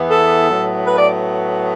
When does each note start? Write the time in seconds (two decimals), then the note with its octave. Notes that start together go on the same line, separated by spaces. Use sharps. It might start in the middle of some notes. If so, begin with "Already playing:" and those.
Already playing: E2 E3 B3
0.09 A4
0.48 A2 F#3 B3
0.87 B4
0.98 D5